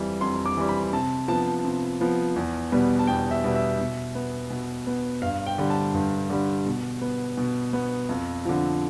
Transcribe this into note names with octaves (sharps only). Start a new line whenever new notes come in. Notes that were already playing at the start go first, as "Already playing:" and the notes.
Already playing: F2 E3 G3
F2 C6
D6
E3 G3
B5
C3 A5
F3 B3 A5
C3
F3 B3
E2
B2 G3 B3
A5
E2 G5
E5
B2 G3 B3
E5
B2
B3
B2
B3
G2 F5
G5
D3 G3
A5
G2
D3 G3
B2
B3
B2
B3
F2
D3 F3